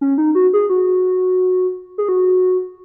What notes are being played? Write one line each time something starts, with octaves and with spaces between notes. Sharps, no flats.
C#4
D#4
F#4
G#4
F#4
G#4
F#4